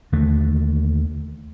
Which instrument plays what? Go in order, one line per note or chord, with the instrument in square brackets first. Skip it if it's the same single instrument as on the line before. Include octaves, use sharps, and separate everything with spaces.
[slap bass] D#2 D3 A3